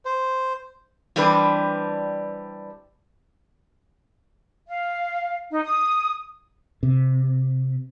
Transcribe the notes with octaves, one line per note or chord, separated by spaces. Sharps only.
C5
E3 G3 C4 D4 B4
F5
D#4
D#6
C3